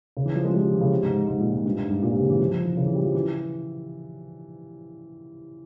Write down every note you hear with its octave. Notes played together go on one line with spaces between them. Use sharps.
C#3
E3
F3
G#3
F3
G3
F3
E3
C#3
C3
G#2
G#2
A#2
G#2
G2
G#2
G2
A#2
C3
C#3
E3
F3
F3
E3
C#3
E3
G3
F3
E3